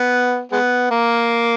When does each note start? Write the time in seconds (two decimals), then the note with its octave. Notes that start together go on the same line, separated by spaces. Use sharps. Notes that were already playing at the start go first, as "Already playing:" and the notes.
Already playing: B3
0.52 G#3 B3
0.91 A#3